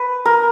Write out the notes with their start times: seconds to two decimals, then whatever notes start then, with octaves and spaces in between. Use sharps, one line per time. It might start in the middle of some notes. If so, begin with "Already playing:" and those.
Already playing: B4
0.25 A#4